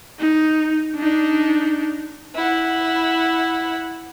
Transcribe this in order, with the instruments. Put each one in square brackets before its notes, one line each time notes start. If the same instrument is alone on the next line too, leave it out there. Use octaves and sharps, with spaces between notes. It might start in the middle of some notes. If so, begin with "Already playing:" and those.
[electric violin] D#4
D4 D#4
[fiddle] E4 F#5